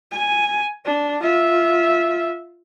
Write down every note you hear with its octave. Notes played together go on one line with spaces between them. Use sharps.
G#5
D4
F4 E5